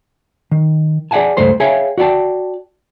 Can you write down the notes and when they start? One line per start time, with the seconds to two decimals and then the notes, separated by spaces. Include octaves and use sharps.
0.51 D#3
1.11 G#4 D5 E5 F#5 G#5 A5
1.37 C#2 G2 A3 C5 C6
1.60 G#4 C#5 E5 F5 G5 G#5
1.98 F#4 D5 G5 A5